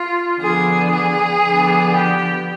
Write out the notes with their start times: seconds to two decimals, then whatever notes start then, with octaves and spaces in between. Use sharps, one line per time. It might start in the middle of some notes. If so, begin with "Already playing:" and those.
Already playing: F4
0.39 D3 F3 B3 D4 G#4
0.91 G#4
1.44 D3 F3 B3 D4
1.96 G4